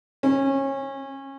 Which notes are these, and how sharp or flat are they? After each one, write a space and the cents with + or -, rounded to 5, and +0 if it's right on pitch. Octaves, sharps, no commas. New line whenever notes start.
C#4 -25